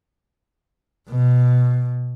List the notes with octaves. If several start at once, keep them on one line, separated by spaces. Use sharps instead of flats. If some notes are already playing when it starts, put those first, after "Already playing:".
B2